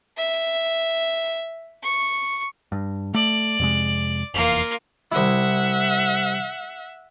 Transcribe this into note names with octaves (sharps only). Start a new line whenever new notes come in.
E5
C#6
G2
A3 D5
F2 C3 G#3
F1 E2 A#3 F4
C2 E4 E5 F#5